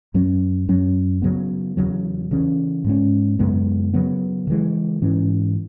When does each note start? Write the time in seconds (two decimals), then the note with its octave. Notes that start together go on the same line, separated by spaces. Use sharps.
0.14 F#2 F#3 C#4
0.68 F#2 F#3 C#4
1.22 C#3 F#3 B3
1.77 E2 C#3 F#3
2.31 C#3 E3 C#4
2.84 G#2 G#3 C#4
3.39 F#2 C#3 G#3 B3
3.93 C#3 F#3 B3
4.47 C#3 E3 G#3
5.02 G#2 E3 C#4